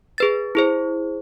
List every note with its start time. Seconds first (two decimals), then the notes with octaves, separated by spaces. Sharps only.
0.18 G#4 B4 A6
0.55 E4 G#4 C5